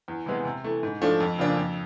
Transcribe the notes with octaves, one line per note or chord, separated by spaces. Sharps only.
E2
C3 E3 G#3 B3
C3
E3 A3
G#2
F3 A3 D4
F2
C#3 F3 A#3 D4
F2